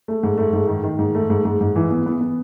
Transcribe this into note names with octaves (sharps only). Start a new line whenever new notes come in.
A3
G#2
A3
G#2
D#3
D#3
G#2
A3
G#2
G#2
G#2
E3
B3
B3
B3